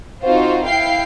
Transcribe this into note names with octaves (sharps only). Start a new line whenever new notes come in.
C4 D#4 F4 F#4 C5
E4 F5 G5 C7